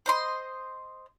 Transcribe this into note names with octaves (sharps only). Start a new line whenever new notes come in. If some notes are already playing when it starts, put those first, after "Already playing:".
C5 D#5 C6